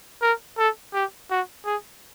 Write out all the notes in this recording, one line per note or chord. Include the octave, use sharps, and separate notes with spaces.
A#4
A4
G4
F#4
G#4